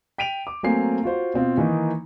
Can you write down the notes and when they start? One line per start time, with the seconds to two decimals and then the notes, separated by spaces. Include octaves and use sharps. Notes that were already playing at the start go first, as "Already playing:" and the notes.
0.18 G5 B6 D7 D#7 F7
0.47 D6
0.63 F#3 A3 A#3 C4 G#5 C7
1.03 F4 F#4 C5
1.34 B2 C4 F4
1.57 D#3 E3 A#3 D#4